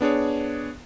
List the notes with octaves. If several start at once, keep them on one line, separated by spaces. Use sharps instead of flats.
B3 D4 G#4 C#5